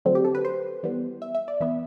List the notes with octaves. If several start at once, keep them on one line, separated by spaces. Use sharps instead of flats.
D3 F#3 A3 C4
G4
A4
B4
C5
E3 G3 B3
E5
E5
D5
E3 B3 E5